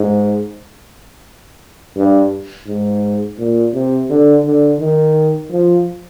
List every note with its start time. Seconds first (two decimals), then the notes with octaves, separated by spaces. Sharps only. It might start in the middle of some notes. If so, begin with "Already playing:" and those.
Already playing: G#2
1.97 G2
2.68 G#2
3.38 A#2
3.74 C3
4.10 D3
4.45 D3
4.80 D#3
5.51 F3